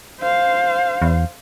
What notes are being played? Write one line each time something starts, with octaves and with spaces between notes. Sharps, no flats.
C5 F5
E2